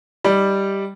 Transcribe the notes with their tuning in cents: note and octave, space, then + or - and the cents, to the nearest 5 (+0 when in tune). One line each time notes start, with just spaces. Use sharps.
G3 +0 D#4 +10 D5 +0